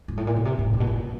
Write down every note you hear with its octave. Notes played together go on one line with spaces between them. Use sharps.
G#2
A2
A#2
B2
C3
A2
A2
B2
A#2